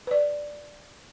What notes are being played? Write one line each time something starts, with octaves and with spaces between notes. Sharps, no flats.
B4 D5